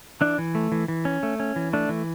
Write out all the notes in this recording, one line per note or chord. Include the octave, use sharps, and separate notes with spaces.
E3 D4
E3
A3
E3
E3
C#4
A3
C#4
E3
A3 D4
E3